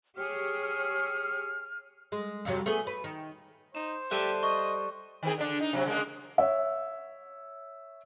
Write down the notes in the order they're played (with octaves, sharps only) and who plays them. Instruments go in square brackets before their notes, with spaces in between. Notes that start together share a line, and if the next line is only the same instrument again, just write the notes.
[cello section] G4 G#4 C#5 [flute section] F6
[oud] G#3
F2 C3 F#3
A3 B3 G#4
B4
D#3
[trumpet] D#4 [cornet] C5 [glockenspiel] E7
[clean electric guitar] G3 A4 E5 [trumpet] G4 [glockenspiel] F#6 D#7
[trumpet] D#5 [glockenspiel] C#6
[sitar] D#3 C4 G#4
D3 D4
D#4
C3 F#3
C#3 G#3 A#3
[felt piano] C#5 E5